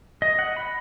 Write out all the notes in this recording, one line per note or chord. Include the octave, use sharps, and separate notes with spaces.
D#5
F#5
B5